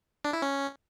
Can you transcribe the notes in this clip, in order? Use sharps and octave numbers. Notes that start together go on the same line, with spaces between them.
D4
E4
C#4